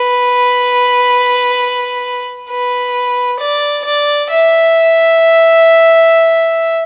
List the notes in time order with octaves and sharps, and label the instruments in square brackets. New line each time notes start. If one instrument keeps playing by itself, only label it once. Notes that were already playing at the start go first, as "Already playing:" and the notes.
Already playing: [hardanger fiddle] B4
B4
D5
D5
E5